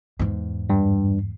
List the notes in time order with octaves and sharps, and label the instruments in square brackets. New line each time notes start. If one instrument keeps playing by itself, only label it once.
[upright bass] E2 G#2
[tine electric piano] G2